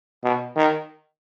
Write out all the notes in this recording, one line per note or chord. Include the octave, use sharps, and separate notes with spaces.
B2
D#3